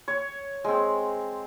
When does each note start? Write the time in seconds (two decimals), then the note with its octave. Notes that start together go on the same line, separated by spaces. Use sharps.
0.08 C#5
0.64 G#3 C4